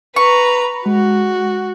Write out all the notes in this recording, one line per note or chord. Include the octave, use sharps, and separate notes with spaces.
B4 A#5 B5 C#6
G#3 F#4